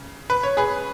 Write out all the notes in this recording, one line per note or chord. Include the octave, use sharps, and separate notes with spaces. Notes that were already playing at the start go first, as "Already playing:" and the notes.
Already playing: C#3
B4
C#5
G#4 B4